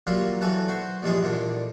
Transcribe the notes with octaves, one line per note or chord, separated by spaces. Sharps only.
F#3 G3 A#3 F4 E5
E2 E3 F#3 A4 B4 G#5
F#4 C5
A#1 E2 G2 G#3 E4 G#4
E2 A#2 D3